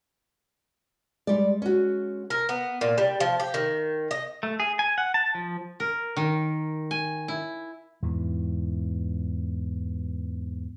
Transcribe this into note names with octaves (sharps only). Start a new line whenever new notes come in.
G3 G#3 D5
C#4 F#4
A#4
B3
A#2
G3
F3
G4
D#3
D#5
A3
G#4
G#5
F#5
A5
F3
A#4
D#3
G#5
E4
E2 G#2 E3